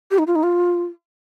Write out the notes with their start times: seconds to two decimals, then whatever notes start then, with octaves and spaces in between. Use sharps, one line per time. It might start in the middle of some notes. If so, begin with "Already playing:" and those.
0.11 G4
0.18 D#4
0.27 F4
0.35 D#4
0.43 F4